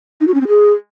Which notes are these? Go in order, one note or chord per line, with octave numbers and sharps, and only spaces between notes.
D#4
F#4
C#4
C4
G#4